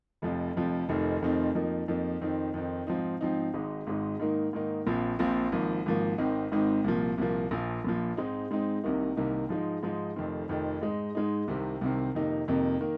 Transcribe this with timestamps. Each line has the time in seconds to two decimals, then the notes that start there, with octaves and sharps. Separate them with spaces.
0.22 F1 F2 F3
0.56 F1 F2 F3
0.89 F1 F2 D#3 C4 D#4
1.22 F1 F2 D#3 C4 D#4
1.55 F2 F3 A#3 D#4
1.88 F2 F3 A#3 D#4
2.21 F2 D#3 C4 D#4
2.54 F2 D#3 C4 D#4
2.87 G#2 F3 C4 D#4
3.21 G#2 F3 C4 D#4
3.54 G#1 G#2 G#3 D#4
3.87 G#1 G#2 G#3 D#4
4.20 G#2 D#3 A#3 D#4
4.53 G#2 D#3 A#3 D#4
4.86 A#1 A#2 F3 C4
5.19 A#1 A#2 F3 C4
5.52 G#1 G#2 F3 A#3
5.86 G#1 G#2 F3 A#3
6.18 G#1 G#2 D#3 C4 D#4
6.52 G#1 G#2 D#3 C4 D#4
6.84 C2 A#2 F3 A#3
7.18 C2 A#2 F3 A#3
7.51 A#1 A#2 F3
7.84 A#1 A#2 F3
8.17 G#2 G#3 C4 D#4
8.51 G#2 G#3 C4 D#4
8.83 C2 C3 D#3 A#3 D#4
9.17 C2 C3 D#3 A#3 D#4
9.49 G#2 F3 G#3 D#4
9.83 G#2 F3 G#3 D#4
10.16 F1 F2 D#3 C4
10.49 F1 F2 D#3 C4
10.82 G#2 G#3 D#4
11.15 G#2 G#3 D#4
11.48 C2 C3 D#3 C4
11.81 C2 C3 D#3 C4
12.15 F2 C3 D#3 A#3 D#4
12.48 F2 C3 D#3 A#3 D#4
12.81 D#3 A#3